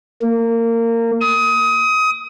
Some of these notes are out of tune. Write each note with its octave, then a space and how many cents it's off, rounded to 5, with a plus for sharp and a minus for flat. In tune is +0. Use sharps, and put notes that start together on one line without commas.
A#3 -20
D#6 +25